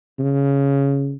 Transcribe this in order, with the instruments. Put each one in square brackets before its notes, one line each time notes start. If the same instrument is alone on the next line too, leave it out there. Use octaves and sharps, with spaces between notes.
[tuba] C#3